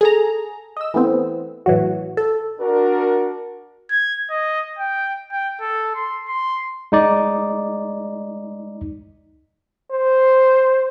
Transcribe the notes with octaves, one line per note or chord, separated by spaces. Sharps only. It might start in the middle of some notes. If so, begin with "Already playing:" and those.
G#4 A4 A#5
D#5 E6
E3 A3 B3 C4
A2 E3 F#3 F#4
A4
D4 F#4 A#4
G#6
D#5
G5
G5
A4
C6
C6
G#3 D#4 D5
C5